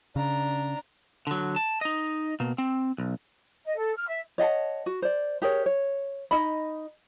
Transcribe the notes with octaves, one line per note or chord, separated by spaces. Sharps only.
C#3 D4 A#5
D3 F#3
A5
D#4 D#5
B2 A#3
C4
B1
D#5
A4
F6
E5
C#5 D#5 F#5 A5
F#4
C5 D5
G4 G#4 A#4 C#5
C#5
D#4 D#5 B5